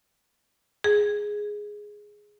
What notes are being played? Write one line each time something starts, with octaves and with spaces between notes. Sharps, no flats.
G#4